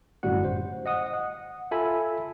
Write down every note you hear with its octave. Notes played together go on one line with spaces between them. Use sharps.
G1 F#2 A2 G3 F#4 F#5
C5
D#5 F#5 D#6
F#5
F4 A4 E5 G#5 B5